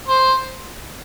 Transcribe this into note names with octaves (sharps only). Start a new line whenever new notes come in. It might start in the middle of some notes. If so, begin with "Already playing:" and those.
C5